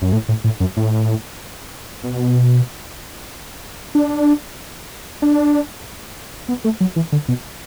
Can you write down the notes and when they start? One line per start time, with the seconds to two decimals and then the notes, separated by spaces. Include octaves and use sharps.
0.02 F#2
0.13 A2
0.29 A2
0.44 A2
0.60 F#2
0.77 A2
2.04 B2
3.95 D4
5.22 D4
6.48 B3
6.64 A3
6.81 F#3
6.96 E3
7.12 D3
7.28 B2